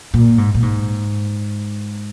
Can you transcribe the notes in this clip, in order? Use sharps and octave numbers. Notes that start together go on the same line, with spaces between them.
A#2
G#2
A#2
G#2